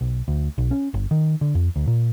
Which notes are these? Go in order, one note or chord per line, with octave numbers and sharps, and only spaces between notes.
B1
D2
B1
C#4
G1
D#3
D3
F2
D2
A#2